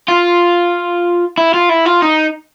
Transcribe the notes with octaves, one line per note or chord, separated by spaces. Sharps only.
F4
E4
F4
E4
F4
D#4